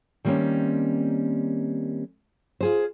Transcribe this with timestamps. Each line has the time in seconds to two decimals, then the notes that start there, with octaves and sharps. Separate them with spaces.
0.25 D#3 G3 A#3 C4 C#4
2.61 F4 G#4 C5